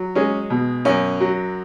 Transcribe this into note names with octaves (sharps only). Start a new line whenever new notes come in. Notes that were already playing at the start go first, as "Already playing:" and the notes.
Already playing: F#3
G#3 C#4
B2
F#2 C#4
F#3